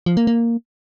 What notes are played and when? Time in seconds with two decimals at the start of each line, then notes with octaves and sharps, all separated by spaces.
0.06 F3
0.17 A#3
0.27 A#3